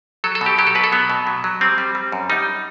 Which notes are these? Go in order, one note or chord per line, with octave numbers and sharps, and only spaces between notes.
F#3 A4
A4
B2
G4
F#3 G4
A4
B2 B4
A4
F#3 B3
B2
F#3
F#3
G3 C4
G3
G3
F#2
G3 D#4